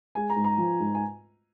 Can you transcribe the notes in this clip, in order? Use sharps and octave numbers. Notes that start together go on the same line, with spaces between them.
G#3 G#5
A#5
G#2
A#5
F3
G#2
G#5